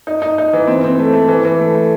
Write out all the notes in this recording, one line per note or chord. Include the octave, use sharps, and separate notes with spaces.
D#4
D#4
D#4
E3
C4
C4
A3
A3
E3
E3
A3
A3